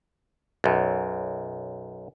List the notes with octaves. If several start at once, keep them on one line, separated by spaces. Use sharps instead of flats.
B1 F#2